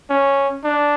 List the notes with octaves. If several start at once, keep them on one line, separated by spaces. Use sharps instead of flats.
C#4
D4